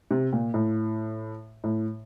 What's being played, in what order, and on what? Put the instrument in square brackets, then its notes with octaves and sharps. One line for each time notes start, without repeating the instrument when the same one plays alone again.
[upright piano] C3
A#2
A2
A2